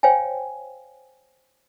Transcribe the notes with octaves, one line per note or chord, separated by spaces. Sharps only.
C5 C#5 F5 G5 G#5